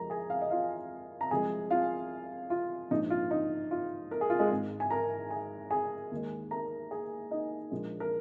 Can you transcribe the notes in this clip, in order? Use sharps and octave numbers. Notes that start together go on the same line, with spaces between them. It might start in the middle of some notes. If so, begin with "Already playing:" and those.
Already playing: F2 F3 G#3 A#4 A#5
G#4 G#5
F5
D#5
F4 F5
A#5
C2 C3 F3 G#3 G#4 G#5
F4 F5
F4
A#1 G#2 F3 D#4
F4
D#4
F4
A#4
G#4
F4
G#3 G#4
G#1 G#2 G#3
G#5
A#4 A#5
G#4 G#5
G#4 G#5
D#2 D#3 G#3
A#4 A#5
G#4 G#5
D#4 D#5
A#1 A#2 F3 G#3
A#4